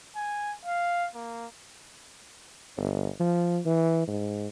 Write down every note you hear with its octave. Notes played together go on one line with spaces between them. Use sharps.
G#5
F5
A#3
G1
F3
E3
G#2